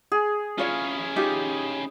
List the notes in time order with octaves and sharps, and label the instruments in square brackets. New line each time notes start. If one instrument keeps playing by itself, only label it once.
[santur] G#4
[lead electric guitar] C#4 E4 [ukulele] F4 C#5 F5
[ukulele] D#4 F4 G4